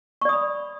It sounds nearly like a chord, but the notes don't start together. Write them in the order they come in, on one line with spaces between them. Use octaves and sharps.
C#6 D5 D#6 B5